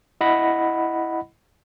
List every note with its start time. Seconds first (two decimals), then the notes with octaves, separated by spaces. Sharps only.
0.21 E4 D#5 F#5 B5 A#6